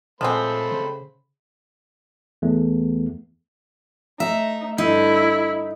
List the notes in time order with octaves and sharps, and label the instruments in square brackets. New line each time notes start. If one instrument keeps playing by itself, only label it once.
[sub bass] A#2 [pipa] F3 G#3 C4 [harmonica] A3 C5 B5
[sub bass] C#3
[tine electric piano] E2 A3
[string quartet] A3 D#4 [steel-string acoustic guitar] E5
[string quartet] G2 D3 [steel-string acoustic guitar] D#4 [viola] E4